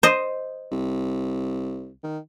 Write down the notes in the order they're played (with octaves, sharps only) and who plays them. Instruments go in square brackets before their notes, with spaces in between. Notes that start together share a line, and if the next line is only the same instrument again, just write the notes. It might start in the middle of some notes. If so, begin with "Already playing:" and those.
[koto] C5 D#5
[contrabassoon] C2
D#3